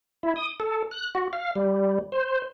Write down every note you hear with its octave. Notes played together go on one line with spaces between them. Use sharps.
E4
D#6
A4
F#6
F#4
F5
G3
C5